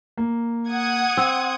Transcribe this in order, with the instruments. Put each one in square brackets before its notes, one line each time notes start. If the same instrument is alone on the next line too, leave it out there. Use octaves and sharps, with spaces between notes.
[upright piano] A#3
[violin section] F#5 D#6 G#6
[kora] C4